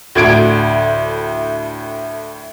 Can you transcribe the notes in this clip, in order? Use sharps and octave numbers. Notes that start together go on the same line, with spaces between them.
D2 A2 G#6 D7